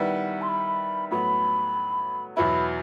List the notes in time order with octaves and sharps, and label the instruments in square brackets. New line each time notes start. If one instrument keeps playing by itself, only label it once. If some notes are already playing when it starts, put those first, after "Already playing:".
Already playing: [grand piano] D#3 G3 B3 E4 B4 [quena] F#5
[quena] C6
B5
[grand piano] A2 F#3 B3 [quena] B5
[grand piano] E2 B2 F#3 B3 E4 [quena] B5